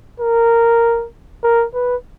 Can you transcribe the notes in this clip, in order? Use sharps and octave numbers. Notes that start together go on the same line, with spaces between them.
A#4
A#4
B4